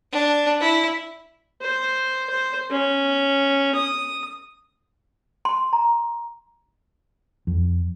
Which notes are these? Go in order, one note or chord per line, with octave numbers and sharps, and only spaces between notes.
D4
E4
C5
C5
C#4
D#6
C6
A#5
F2